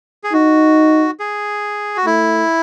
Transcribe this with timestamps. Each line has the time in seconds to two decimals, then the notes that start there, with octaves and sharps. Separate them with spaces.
0.24 G#4
0.33 D#4 F#4
1.20 G#4
1.97 F#4
2.05 A3 E4